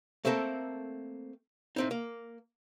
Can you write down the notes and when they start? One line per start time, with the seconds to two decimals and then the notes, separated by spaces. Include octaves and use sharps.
0.25 A3 A#3 C4 A4 A#4
1.76 A2 C4 D#4
1.91 A#3